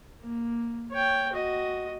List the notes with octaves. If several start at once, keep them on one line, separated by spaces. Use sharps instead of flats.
A#3
C#5 G5
F#4 D#5